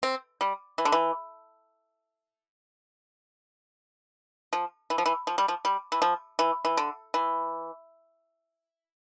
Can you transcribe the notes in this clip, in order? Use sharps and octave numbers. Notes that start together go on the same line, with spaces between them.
C4
G3
E3
D3
E3
F3
E3
F3
E3
F3
G3
F3
G3
E3
F3
E3
E3
D3
E3